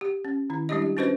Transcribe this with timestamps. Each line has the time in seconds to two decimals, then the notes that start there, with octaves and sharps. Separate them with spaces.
0.01 G4
0.25 C#4
0.50 D#3 E4
0.69 G3 G#3 D4 E4 G4 D#5
0.82 G4
0.97 C#4 D4 F#4 B4 C5 D#5